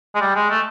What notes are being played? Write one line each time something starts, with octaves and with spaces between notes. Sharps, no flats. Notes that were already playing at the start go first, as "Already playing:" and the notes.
G#3
G3
G#3
A3